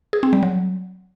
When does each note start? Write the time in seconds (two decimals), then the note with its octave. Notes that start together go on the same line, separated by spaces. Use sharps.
0.13 G#4
0.23 C4
0.33 G3
0.43 F#3